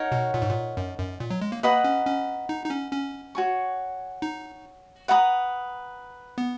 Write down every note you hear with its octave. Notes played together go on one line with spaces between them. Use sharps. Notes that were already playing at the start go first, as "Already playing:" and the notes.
Already playing: D#4 A#4 C#5 F#5
B2
A#2
G#2
A#2
F#2
F#2
A#2
F#3
G#3
A#3
A#3 B4 D#5 F#5 A#5
C#4
C#4
D#4
D#4
C#4
C#4
F#4 C#5 G#5 C#6
D#4
B4 F#5 A#5 D#6
B3